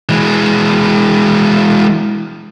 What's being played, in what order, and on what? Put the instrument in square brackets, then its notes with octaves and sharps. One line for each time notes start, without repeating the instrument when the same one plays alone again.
[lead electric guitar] E3 G#3